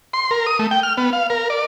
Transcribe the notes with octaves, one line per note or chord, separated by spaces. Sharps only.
C6
A#4
D#6
A3
G5
F6
B3
F5
A#4
D5